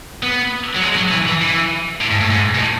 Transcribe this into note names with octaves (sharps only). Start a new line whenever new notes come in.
B3
F#3
G#3
F#3
E3
E3
E3
A2
G#2
A2
G#2
B2
A2